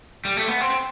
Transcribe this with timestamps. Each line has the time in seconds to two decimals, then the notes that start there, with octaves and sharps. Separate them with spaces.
0.25 G3
0.37 A3
0.48 B3
0.60 C4